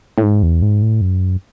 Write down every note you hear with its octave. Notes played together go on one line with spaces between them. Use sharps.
A2
G#2
E2
G#2
A2
F#2